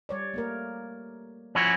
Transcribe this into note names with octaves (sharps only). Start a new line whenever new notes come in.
G3 C#5 D5
A3 A#3 A#4
F3 C#4 E4 F#4